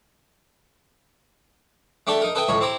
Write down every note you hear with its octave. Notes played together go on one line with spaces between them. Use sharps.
A3 D4 G4 A4 D5 E5
D#4 A#4
A4 B4 D#5 E5 G5
C#2 A2 C#5 B5
C4 E4 G4 A#5